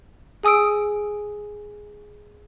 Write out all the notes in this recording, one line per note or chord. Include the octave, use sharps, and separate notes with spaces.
G#4 G#5 D#6 E6 D7